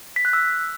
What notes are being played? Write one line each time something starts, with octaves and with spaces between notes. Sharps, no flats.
B6
F#6
E6